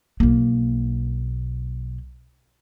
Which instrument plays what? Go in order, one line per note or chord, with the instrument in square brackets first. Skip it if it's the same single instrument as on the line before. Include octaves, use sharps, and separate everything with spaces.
[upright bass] B1 A#3